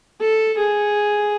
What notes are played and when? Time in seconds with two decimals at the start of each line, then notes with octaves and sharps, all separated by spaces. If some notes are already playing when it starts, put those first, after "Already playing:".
0.21 A4
0.58 G#4